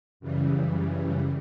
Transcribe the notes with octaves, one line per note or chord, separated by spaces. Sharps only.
F#2 C#3 E3 G3